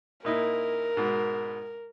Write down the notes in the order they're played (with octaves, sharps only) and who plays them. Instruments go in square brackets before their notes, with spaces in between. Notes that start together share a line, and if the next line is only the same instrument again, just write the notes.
[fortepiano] A#2 D#4 E4 [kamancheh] A#4
[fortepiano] G#2 B2